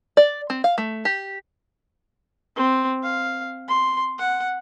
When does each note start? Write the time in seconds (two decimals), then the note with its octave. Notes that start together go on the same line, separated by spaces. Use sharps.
0.17 D5
0.50 C4
0.64 F5
0.78 A3
1.05 G4
2.56 C4
3.03 F5
3.68 C6
4.19 F#5